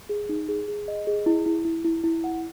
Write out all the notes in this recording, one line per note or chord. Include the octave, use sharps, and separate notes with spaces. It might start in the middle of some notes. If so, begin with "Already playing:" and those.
G#4
D#4
G#4
G#4
D#5
G#4
E4
E4
E4
E4
E4
F#5